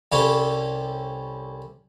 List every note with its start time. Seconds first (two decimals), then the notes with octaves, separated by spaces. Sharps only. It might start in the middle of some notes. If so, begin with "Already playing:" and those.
0.12 C2 G3 C#4 A4